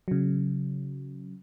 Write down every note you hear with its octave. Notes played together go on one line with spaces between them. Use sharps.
C#3 F#3